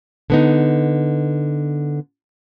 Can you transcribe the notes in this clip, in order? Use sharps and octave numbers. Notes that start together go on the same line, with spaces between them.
D3 B3 D#4